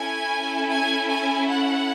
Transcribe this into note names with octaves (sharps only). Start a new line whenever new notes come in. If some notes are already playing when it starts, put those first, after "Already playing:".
Already playing: C#4 E4 A4 G#5
G#5
G#5
F#5